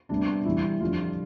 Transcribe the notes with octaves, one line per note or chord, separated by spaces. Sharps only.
C3 G3 B3 D4
C3 E3 G3 E4
F2 D3 G3 F4